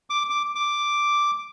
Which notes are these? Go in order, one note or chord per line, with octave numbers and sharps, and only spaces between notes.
D6
D6
D6